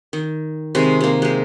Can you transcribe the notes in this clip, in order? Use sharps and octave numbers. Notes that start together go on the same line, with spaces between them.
D#3
C3 D#3 G#3
C3 A#3
G#3 G4